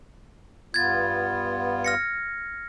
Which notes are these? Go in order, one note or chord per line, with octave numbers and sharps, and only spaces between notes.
G2 B3 F4 G#6 A6
F6 A#6 C#7